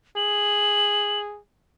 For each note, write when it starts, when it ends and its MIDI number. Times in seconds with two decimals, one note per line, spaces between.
0.17 1.39 68
0.17 1.20 102